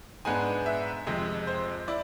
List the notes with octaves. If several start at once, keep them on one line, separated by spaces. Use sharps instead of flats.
G#2 G#3 B3 D4 G#5
E5
F2 C3 G#3
C5
E4 D5